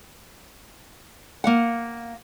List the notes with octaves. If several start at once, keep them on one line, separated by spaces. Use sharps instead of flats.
A#3 F5 F#5